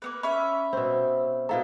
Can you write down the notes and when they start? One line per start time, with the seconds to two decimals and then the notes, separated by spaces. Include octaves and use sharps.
0.02 A#3 B3 B4
0.23 C#4 E5 B5
0.73 B2 C4
1.49 B2 E4 A4 F5 A#5